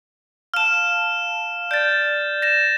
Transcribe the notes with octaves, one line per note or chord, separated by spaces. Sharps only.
F5 A5 F6 E7
D5 G6 A6
A#6 E7